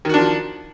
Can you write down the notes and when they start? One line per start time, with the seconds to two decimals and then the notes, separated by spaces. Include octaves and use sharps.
0.05 D#3
0.09 F#4
0.14 D4
0.18 F3